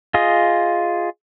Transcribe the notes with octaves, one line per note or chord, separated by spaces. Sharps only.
F4 G#4 D#5